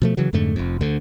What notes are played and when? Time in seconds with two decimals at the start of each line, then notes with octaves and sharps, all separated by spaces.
0.02 B2 F3 A3
0.17 C#3 E3 F#3
0.33 F2 G#2 D3 A3
0.56 F1 F2
0.81 D2 D3